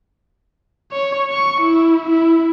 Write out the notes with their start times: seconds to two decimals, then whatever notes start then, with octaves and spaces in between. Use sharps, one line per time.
0.92 C#5
1.31 C#6
1.61 E4
2.10 E4